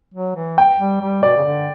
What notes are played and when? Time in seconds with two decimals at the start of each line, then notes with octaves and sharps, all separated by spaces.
0.14 F#3
0.35 E3
0.58 G5
0.79 G3
1.01 G3
1.23 B2 D5
1.36 C#3
1.44 D3